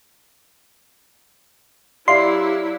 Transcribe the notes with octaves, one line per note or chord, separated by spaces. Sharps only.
F#3 E4 G4 D5 E5 F5 C6